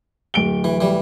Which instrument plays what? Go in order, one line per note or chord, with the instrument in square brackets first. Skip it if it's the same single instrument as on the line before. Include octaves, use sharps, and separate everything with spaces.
[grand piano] D1 D7 G7
[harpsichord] E3
E3 G3